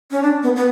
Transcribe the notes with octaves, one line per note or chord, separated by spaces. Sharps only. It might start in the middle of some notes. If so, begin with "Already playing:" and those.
C#4
D4
B3
B3